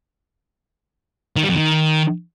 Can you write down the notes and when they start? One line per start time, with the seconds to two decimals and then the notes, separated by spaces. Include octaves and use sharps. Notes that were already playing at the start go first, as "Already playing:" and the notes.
1.36 D#3
1.43 G3
1.49 F2
1.56 D#3